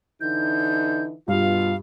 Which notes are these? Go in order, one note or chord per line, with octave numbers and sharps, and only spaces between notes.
D3 E3 D#4 G6
G2 B2 F4 F5